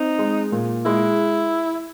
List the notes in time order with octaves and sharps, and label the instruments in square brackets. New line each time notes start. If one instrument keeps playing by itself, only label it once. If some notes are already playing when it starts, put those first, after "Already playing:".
Already playing: [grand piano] C4 [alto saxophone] D#4
[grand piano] G#3
A#2
[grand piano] G#3 [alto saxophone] E4